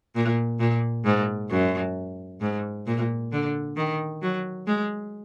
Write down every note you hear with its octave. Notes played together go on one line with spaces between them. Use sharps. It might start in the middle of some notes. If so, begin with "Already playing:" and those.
A#2
A#2
G#2
F#2
G#2
A#2
D3
D#3
F#3
G#3